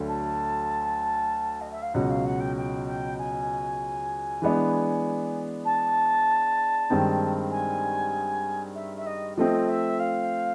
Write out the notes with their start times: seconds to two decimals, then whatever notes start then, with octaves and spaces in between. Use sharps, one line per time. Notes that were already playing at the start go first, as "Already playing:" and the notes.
Already playing: D2 D3 F#3 A3
0.08 A5
1.61 D#5
1.71 E5
1.82 F5
1.94 C#2 B2 F#3 F#5
2.10 F5
2.26 F#5
2.40 G5
2.57 G5
2.87 G5
3.18 G#5
4.42 E3 G#3 B3 D4
5.65 A5
6.90 G2 D#3 G#3 C4 D#4
7.51 G#5
8.75 E5
8.97 E5
9.06 D#5
9.37 F3 A3 C4 D#5
9.68 E5
10.00 F5